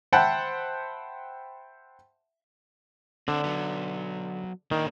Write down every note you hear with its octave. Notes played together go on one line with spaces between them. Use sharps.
C5 E5 F#5 G5 A5 B5
D3 C4 D4
F#3 B3
D#3 A#3 D4